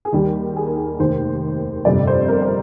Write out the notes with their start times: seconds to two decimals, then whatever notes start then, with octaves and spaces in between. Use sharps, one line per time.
0.05 G#4
0.12 D#2 D#3 G3 G4
0.56 G#4
0.67 A#4
0.76 G#4
0.99 F1 D#2 D#3 C5
1.85 G1 F2 C3 D5
2.07 C5
2.28 A#4
2.42 C5